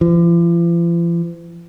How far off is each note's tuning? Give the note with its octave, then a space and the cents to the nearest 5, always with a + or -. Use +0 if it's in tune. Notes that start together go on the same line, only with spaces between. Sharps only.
F3 -45